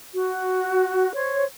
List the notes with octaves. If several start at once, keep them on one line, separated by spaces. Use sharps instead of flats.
F#4
C5 C#5